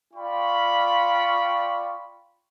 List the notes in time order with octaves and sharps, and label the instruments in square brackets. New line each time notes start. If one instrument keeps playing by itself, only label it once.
[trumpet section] F4 D5 G5 B5 C#6